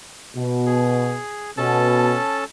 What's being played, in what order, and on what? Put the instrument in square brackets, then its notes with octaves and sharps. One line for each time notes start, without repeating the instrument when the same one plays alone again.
[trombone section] B2
[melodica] G#4
[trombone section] B2 [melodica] C#4 A4 A5